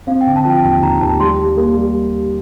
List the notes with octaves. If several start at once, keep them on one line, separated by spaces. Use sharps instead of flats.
C4 F5
G5
D3
A5
F3 G5
D#2 G5
D#2 A#5
D#2 A5
G3 C6
G3
A#3
G3